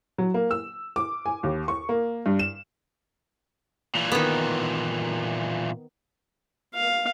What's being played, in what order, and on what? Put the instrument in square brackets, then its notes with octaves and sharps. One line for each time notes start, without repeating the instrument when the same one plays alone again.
[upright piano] F#3
A#3
E6
D6
G#5
D#2
C#6
A#3
G2
E7
[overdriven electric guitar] A#2 E3
[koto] D#3 B3
[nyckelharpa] F5